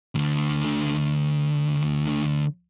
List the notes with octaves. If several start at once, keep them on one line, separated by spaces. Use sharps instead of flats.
D2 D3